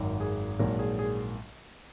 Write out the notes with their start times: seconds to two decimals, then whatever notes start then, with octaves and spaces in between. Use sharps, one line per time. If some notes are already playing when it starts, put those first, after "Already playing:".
Already playing: G#1 F#2 D#3
0.20 G#4
0.59 A#1 G#2 D#3 F#3 A#4
0.79 G#4
0.99 G#4